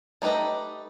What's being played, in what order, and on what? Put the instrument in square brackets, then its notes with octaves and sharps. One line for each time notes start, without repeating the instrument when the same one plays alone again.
[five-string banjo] A3 D#4 G4 B4 D#5